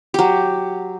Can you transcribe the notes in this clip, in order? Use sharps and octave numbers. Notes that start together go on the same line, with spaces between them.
F#3 G4